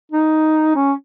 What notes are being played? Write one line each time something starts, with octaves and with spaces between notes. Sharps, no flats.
D#4
C#4